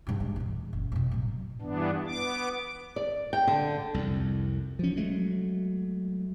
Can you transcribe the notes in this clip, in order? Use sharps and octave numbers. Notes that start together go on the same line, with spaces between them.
G2 F4
G#3
E2 A#2
F#1
F2 B2
A2 F#3
G2 E3 B3 D4
B3 D6
D5
G5
D3
C2 F2
F3 C#4
F#3 G#3 A3